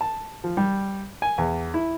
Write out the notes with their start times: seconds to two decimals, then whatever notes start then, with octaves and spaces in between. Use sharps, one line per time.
0.01 A5
0.44 F3
0.57 G3
1.22 G#5
1.38 E2
1.74 E4